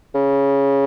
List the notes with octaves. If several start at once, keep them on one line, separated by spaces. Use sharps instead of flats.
C#3